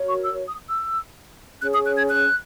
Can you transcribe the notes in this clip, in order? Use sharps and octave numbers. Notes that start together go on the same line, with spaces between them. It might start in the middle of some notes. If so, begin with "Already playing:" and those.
Already playing: F#4 A#4 C#5
C#6
E6
D#6
E6
C#4 G#4 C#5 F#6
D#6
F#6
G#6
F#6